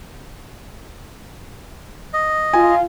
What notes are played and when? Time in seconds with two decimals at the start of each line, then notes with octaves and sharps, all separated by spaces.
2.13 D#5
2.53 F4 G#5